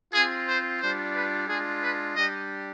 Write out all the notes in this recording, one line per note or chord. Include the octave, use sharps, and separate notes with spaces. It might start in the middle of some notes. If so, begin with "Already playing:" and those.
C4 F4 G#4
C5
G3 D4 F4 C5
B4
G#3 D4 F4 G#4
B4
G3 D4 G4 D#5